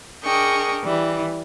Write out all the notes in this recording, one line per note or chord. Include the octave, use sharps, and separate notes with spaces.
D4 G#4 A#4 D#5 G5 C#6
E3 G3